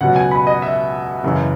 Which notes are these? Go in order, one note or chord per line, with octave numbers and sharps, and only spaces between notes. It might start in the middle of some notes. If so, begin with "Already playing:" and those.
C#2 B2 F#3 F#5
G#5
B5
D#5
E5
F#1 F#2 C#3 E3